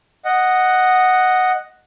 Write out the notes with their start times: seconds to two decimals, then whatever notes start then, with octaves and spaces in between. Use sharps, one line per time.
0.25 D#5 F#5